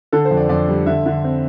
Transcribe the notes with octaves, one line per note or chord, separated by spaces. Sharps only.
D3 A4
C5
F2
D5
F2 D5
G3
D3 E5
D3
C4